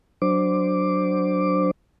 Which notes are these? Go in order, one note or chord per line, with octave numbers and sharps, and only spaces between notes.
F#3 D4 C5 D6